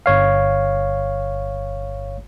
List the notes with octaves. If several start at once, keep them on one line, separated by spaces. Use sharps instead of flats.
G1 C#5 F5